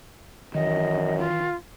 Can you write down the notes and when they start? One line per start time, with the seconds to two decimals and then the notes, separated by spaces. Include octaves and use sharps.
0.55 F#2 D#3 E3 D#5
1.19 F4